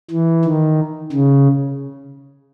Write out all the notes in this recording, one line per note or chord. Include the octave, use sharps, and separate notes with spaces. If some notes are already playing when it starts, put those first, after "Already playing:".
E3
D#3
C#3